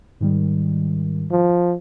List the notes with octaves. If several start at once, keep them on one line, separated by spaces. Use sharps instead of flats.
G#2 D#3 G3
F3